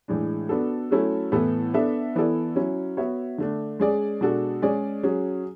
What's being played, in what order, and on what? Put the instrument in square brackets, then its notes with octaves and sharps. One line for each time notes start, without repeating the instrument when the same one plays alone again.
[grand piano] A2 E3 G#3 D4
B3 D4 F#4 A4
F#3 A3 C#4 E4 A4
A2 E3 B3 E4 A4
B3 D4 A4 E5
E3 B3 E4 A4 D5
F#3 C#4 E4
B3 F#4 C#5 E5
D3 A3 D4
G#3 C#4 G#4 D5
B2 G#3 D4 F#4 A4
G#3 C#4 G#4 D5
F#3 C#4 G#4